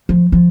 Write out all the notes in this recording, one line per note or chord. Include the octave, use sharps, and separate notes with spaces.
F3
F3